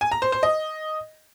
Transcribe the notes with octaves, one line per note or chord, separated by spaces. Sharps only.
G#5
A#5
C5
C5
D#5